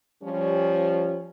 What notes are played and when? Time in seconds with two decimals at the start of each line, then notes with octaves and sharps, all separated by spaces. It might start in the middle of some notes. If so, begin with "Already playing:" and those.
0.22 F3 G3 C#4